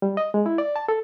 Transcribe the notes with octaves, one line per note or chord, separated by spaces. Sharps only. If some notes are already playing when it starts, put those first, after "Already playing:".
G3
D#5
G#3
E4
D5
A5
A4